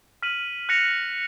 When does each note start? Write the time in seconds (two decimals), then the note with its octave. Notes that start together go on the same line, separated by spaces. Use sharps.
0.22 F6 B6 D#7 F#7
0.69 F#6 A#6 C#7 F7